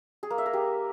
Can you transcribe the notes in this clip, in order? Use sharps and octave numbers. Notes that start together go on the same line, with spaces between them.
G#4
A#3
E5
A#4
G4